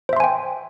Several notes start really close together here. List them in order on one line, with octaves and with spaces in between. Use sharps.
C5 E5 C6 G#5 G5